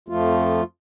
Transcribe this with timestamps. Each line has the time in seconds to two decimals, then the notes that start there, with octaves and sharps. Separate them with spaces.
0.09 F2 F3 A3 F4